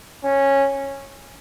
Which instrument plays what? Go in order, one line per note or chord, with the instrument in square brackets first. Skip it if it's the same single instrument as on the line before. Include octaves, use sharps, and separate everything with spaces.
[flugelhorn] C#4